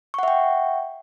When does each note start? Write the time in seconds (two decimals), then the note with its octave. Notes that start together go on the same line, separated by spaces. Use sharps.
0.14 C#6
0.19 F#5
0.23 E5
0.28 G5